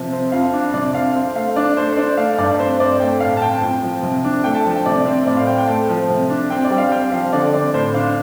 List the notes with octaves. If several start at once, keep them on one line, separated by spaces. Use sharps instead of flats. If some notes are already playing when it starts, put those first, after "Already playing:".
Already playing: C3 F3
C4
F2 F5
D4
C3 D5
C4 F5
C4
A3 F5
D4 D5
A3 C5
C5
D4 D5
A3 F5
G2 D5
C4 C5
C4 D5
A3 G5
A2 F5
A5
C4 G5
A5
F2 G5
F3
C3
D4
A3 G5
A5
F3
G5
C3 D5
C4
A2 D5
F5
C4 G5
G5
A3 A5
F3
C3
D4
C4 G5
D5
G3 G5
F5
C4 G5
F3 F5
D3 D5
C4 D5
A2 C5
D4 F5